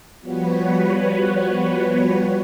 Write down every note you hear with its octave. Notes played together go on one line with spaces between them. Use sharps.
F3 G3 B3 F#4 B4 C#5